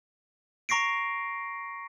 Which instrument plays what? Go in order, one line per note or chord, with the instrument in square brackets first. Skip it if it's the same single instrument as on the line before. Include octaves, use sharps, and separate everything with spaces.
[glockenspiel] A#5 C#6 A#6 C7 D7